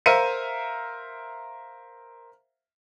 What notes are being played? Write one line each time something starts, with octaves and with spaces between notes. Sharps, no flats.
A#4 C5 E5 F5 C#7 D#7